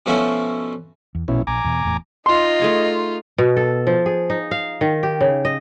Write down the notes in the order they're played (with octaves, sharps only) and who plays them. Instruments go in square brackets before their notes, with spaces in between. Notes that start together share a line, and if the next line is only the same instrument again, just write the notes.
[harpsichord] B2 F3 A3 C#4 E4 F#4
[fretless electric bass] E2
[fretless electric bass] A#1 [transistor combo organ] B2 C#4 E4
[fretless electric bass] A#1 [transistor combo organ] G#5 A#5 D6
[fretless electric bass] E2 B2
F1 E2 A2
[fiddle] D#4 F4 [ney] D#5 [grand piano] C6
[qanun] A3 G#4 D5
[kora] B2
A4
F3
G#4
D#4
F5
D#3
G4
C#3
D#5